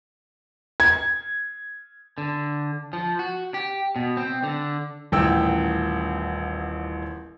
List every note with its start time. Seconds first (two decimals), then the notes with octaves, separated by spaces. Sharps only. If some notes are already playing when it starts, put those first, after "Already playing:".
0.80 G#6
2.18 D3
2.93 F3
3.19 F#4
3.54 G4
3.96 B2
4.17 C4
4.44 D3
5.12 D#1 A1 G5 E6